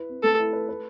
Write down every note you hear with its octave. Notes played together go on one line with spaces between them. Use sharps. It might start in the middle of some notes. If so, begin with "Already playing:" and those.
Already playing: E4 B4
C4
A3 A4
E4
B4
B4